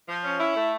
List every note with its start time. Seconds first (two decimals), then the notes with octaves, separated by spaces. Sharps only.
0.08 F3
0.24 C#4
0.40 E4
0.56 A3